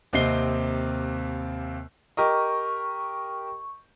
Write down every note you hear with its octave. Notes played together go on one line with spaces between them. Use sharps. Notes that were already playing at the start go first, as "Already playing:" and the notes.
D#2 C3 C4 D#5 C7 G7
G4 A#4 D#5 C#6